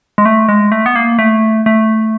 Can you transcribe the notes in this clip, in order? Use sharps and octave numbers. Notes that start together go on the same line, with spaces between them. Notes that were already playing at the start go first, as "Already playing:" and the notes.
G#3
A3
G#3
A3
B3
A#3
A3
A3